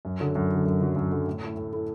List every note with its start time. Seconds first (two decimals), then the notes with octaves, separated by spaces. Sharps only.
0.05 F#2
0.20 D3 F#3
0.35 F#2
0.51 D3 F#3
0.66 F#2
0.81 D3 F#3
0.96 F#2
1.12 D3 F#3
1.27 A2
1.42 A3 E4 A4
1.57 A2
1.73 A3 E4 A4